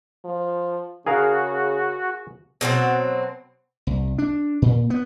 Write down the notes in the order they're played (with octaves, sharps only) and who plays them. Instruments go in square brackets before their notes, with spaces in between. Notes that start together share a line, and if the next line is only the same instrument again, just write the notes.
[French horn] F3
[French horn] C#3 [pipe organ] F#4 [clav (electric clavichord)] G#4 A#4 F5
[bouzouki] B2 F#3 A3 C4
[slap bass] C2
D4
A#2
B3